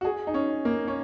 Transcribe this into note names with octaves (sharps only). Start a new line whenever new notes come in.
F#4
G#4
D#4
C#4
A#3
C#4